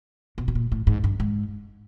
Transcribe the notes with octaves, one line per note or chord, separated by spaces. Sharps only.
B2
B2
A#2
A2
G#2
G2
G#2